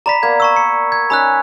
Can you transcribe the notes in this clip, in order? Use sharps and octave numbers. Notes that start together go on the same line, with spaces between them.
D5 A#5 B5 B6
A#3 B3 G#6
A#5 C#6 E6
C#7
G#6
C#4 D#4 B4 B5 E6 F#6